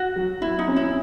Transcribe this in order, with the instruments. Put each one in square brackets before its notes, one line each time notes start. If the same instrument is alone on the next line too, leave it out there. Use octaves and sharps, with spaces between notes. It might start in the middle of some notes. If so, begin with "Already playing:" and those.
Already playing: [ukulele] F#4
[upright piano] F#3
[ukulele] E4 [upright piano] F#4
[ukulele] D#4
[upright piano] C#4
[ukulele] E4